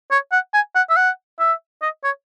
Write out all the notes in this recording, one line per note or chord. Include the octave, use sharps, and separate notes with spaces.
C#5
F#5
G#5
F#5
E5
F#5
E5
D#5
C#5